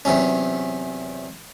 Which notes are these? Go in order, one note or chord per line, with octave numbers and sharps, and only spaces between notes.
E2 C3 F#3 C#4